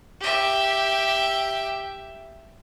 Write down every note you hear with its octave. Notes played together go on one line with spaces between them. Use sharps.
G4 E5